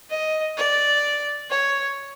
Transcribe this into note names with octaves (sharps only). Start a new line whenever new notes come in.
D#5
D5
C#5